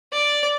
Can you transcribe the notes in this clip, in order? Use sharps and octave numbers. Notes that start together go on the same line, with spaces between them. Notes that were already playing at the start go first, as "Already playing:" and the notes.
D5